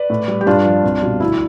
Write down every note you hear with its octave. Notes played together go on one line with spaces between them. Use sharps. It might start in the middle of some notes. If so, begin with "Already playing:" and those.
Already playing: B4 D5
A2
G3
G4
G2 D4 F4
F3
C2
B2 G3
D2 E4